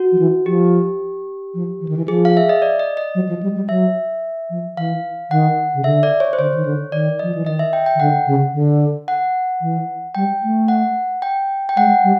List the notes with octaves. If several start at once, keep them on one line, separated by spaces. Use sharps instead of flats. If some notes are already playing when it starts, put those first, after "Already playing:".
Already playing: F#4
F3
E3
F3 G4
F3
E3
D#3
E3
F3 G#4
F5
E5
D#5
D5
D#5
D#5
F#3
F3
G3
G3
F#3 E5
F3
E3 F5
D#3 F#5
C#3
D3 E5
D5
C#5
C5
D3 C#5
D#3
D3
D#3 D5
F3 D#5
E3
D#3 D#5
E5
G5
G5
D#3
D3 F#5
C#3
D3
F#5
E3
G3 G5
A3
F#5
G5
G5
G#3 F#5
G3